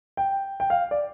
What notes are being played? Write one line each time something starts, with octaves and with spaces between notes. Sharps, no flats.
G5
G5
F5
D5